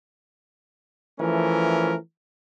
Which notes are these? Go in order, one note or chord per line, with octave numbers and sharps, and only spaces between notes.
E3 F3 A3 C#4 A#4